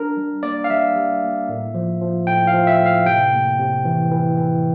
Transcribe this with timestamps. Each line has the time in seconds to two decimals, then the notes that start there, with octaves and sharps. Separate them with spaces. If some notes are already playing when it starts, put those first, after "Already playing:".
Already playing: D4 A#4
0.17 G3
0.43 A#3 D5
0.64 F5
0.70 G3 E5
0.96 G3
1.22 A#3
1.49 A2
1.74 F3
2.01 F3
2.27 A2 G5
2.47 F5
2.53 F3
2.67 E5
2.80 A2
2.86 F5
3.05 C3 G5
3.33 A#3
3.59 C3
3.85 E3
4.11 E3
4.37 E3